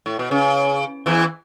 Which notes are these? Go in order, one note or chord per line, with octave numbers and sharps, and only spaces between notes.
A2
B2
C#3
E2 E3